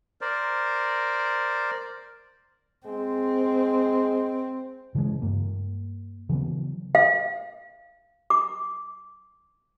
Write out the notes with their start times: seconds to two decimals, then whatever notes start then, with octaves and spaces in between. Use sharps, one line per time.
0.21 A#4 C5 D5
2.86 G#3 C4
4.95 C#3 E3 F#3 G#3
5.22 G2 A#3
6.29 C#3 E3 F#3 B3
6.95 F5
8.30 D6